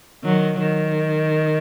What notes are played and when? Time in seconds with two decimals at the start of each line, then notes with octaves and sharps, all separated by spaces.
0.24 D#3 F#3
0.59 D#3